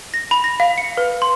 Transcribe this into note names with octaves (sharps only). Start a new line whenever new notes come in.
A#6
B5
A#6
F5
C#7
B4
C6